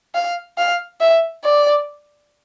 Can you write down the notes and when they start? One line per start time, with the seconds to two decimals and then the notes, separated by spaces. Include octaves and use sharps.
0.15 F5
0.58 F5
1.01 E5
1.44 D5